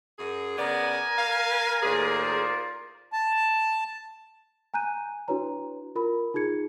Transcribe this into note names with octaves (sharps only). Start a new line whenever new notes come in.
F#2 G#4
C#3 B3 A#4 D5 G#5
F5
D#2 A2 F4 G#4 C5 D5
A5
G#5 A#5 F#6 G6 D#7
D4 E4 F#4 B4 C#5 A#5
F4 A#4 B5
D#4 F4 G#4 G#6 C#7